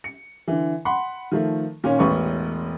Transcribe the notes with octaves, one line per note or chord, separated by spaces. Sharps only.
C#7
D3 E3
F#5 B5 C6
D#3 F3 A3
A#2 D#3 C#4 C#5
E1 A1 B4 C#5 C#6